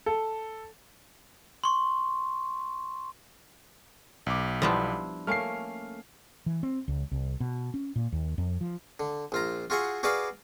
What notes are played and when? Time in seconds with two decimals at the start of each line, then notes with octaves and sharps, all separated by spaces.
0.06 A4
1.64 C6 C#6
4.26 B1 D6
4.62 F3 G3 B3 D4 E4 C5
5.27 A3 A#3 C#4 F6 C7
6.46 E3
6.63 C4
6.88 C#2
7.11 C2
7.40 B2
7.74 C#4
7.96 A#2
8.12 D#2
8.38 F2
8.61 F3
9.00 D3
9.32 A#1 F4 A#5
9.70 F4 F#4 G#4 E5 F#5
10.03 F#4 G#4 B4 D5 F5 B5